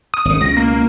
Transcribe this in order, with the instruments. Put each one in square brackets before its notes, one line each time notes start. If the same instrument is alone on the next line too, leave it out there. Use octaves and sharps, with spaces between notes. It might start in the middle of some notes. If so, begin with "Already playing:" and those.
[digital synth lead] D#6
[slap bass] G#1 C#3
[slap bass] C#2 B2 [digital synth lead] A#6
[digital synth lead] A#3